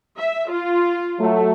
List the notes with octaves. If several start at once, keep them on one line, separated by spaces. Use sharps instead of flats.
E5
F4
F#3 A3